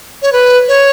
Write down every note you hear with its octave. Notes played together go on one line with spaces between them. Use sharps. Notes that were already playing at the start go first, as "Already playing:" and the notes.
C#5
B4
C#5